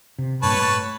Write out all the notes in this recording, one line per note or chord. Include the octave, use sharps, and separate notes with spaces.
C3
G2 A#2 B4 C#5 A5
A2